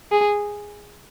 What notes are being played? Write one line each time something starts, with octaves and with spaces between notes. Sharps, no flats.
G#4